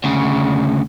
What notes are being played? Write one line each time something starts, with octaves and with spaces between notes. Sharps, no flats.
D2 C#3